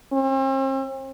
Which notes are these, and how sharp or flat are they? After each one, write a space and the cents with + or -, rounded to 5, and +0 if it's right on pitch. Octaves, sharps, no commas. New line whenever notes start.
C4 +45